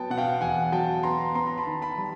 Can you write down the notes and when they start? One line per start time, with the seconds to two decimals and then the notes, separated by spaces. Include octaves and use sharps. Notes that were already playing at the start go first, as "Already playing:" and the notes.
Already playing: F#3 B3 G5 A5
0.10 B2 F#5
0.17 F5 G5
0.41 E2 F#5 G#5
0.72 F#3 G5 A5
1.03 B3 A#5 C6
1.35 B3 A#5 C6
1.47 A#5
1.58 A5 B5
1.67 D#3
1.82 A5 B5
1.98 G3